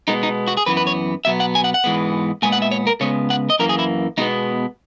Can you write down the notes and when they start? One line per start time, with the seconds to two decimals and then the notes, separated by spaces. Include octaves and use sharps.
0.08 B2 G#3 B3 D#4
0.23 D#4
0.48 F#4
0.57 G#4
0.66 F#2 E3 B3 B4
0.77 B4
0.87 C#5
1.25 B2 F#3 B3 E5
1.40 F#5
1.55 G#5
1.64 F#5
1.74 F#5
1.84 G#2 E3 G#3 B3
2.42 A#2 G#3 B3 G#5
2.52 F#5
2.62 E5
2.71 C#5
2.87 A#4
3.01 C#3 G#3 B3 C#5
3.30 F#5
3.50 D#5
3.59 F#2 E3 A#3 A#4
3.69 G#4
3.79 E4
4.18 B2 G#3 B3 D#4